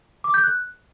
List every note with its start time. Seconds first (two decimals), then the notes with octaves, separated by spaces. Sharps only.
0.24 D6
0.34 G6
0.44 F#6